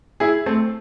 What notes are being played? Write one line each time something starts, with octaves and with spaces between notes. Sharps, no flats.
E4 G#4
A3 C4